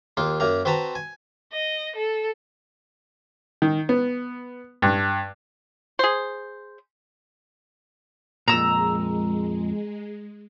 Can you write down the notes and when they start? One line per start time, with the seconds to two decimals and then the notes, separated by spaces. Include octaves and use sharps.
0.17 D#2 A#3 F4
0.40 F#2 A#3 A#5
0.65 C4 F#4 B4 A5 A#5
0.95 G#5
1.52 D#5
1.96 A4
3.62 D#3
3.89 B3
4.82 G2
5.99 G#4 C5
8.48 F2 A#2 G#3 A#5 E6